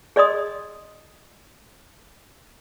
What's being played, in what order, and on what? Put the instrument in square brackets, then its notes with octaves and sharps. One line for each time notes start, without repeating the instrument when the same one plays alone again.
[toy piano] G#4 D5 D#5 C6 D#6